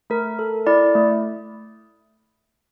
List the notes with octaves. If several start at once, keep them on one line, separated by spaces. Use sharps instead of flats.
A3 A#4
A4
E4 D5
A3